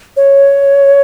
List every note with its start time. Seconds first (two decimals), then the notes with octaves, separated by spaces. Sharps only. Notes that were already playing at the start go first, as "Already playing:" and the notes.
0.17 C#5